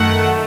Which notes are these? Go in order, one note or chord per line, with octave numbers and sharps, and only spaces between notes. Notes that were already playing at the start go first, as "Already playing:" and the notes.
Already playing: F#2 D#3 A3 F#5